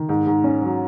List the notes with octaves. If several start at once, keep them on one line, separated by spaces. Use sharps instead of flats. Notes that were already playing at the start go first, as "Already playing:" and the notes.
Already playing: D#3
G#2
G#2
C#4
F#3